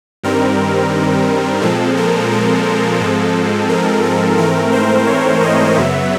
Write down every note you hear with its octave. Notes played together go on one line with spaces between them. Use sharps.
G2 D#3 G3 C4 A#4
A#2 F3 G#3 C4 A4
A#4
A4
G#2 F3 G#3 C4
A#4
A4
G#2 E3 A3 C4 A#4
C5
C#5
D#5
F#2 C#3 F#3 B3 E5